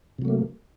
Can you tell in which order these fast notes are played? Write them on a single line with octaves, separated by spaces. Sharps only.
C3 F#3 A3 A#3